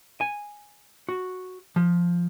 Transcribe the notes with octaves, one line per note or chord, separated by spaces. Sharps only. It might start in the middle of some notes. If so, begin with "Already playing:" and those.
G#5
F#4
F3